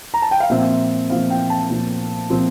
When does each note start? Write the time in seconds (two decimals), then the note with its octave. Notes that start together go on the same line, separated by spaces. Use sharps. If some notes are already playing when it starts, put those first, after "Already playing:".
0.14 A#5
0.22 A5
0.31 G5
0.40 F5
0.50 A#2 F3 C4 E5
1.10 A#2 F3 C4 F5
1.30 G5
1.50 A5
1.70 A#2 F3 C4
2.30 A#2 F3 C4